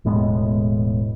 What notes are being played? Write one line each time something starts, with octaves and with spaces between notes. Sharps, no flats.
E1 A2 G#3 B3